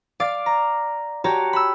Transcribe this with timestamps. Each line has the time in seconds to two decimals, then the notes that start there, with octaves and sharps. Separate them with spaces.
0.20 D5 F5 D6 A6 C7
0.46 A#5
1.24 F#4 G4 C#5 A5 A#5
1.53 B5 E6